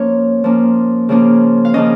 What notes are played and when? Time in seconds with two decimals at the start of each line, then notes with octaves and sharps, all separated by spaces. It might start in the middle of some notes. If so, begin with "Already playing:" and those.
Already playing: F3 A#3 C#4 C#5
0.44 F3 A#3 C#4
1.09 C#3 F3 A#3 C#4
1.65 F5
1.74 C#3 F3 A#3 C#4 D#5